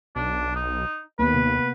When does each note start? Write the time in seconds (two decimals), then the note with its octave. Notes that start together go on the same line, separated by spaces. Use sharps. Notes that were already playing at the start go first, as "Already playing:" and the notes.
0.16 B1 D4
0.56 D#4
1.19 D#2 A#3 B3 B4
1.34 C3 B3